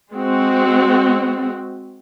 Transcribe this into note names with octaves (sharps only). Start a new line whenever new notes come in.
G#3 C4 F#4